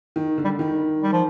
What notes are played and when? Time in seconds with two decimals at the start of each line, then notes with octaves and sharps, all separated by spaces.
0.16 D#3
0.38 D3
0.44 G3
0.59 D#3
1.03 G3
1.12 F3